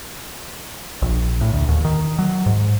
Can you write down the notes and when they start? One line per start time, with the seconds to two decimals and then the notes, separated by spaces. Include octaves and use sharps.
1.02 A#1
1.41 A2
1.53 D2
1.69 D#2
1.85 D#3
2.19 F#3
2.46 G#2